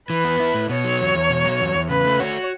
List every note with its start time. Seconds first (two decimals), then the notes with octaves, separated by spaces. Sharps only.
0.09 E3 B4
0.24 B3
0.40 E4
0.55 A2
0.69 B2 C#5
0.84 F#3
1.00 E2
1.15 E2
1.29 B2
1.44 F#3
1.60 E2
1.75 E2
1.89 C#3 B4
2.05 A3
2.20 F#4 C#5